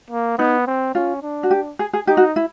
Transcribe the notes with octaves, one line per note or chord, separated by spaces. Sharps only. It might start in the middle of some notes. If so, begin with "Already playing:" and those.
A#3
B3 D#4
C4
C#4 F4
D4
F#4
G4
G#4
G#4
D#4 G4
F#4
E4